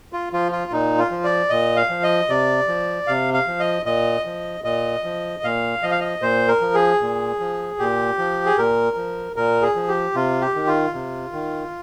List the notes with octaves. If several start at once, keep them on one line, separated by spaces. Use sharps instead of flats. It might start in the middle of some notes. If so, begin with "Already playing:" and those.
F4
F3 F4
F4
A#2 D#4
F4
F3
D5
A#2 D#5
F5
F3
D#5
C3 D5
F3
C3 F5
F5
F3
D#5
A#2 D#5
F3
A#2 D#5
F3
A#2 F5
F3 D#5
F5
D#5
A#2 C5
A#4
F3
G#4
A#2
F3
A#2 G4
F3
G#4
A#2 A#4
F3
A#2 A#4
G#4
F3
G4
C3 F4
G4
D#3
F4
C3
D#3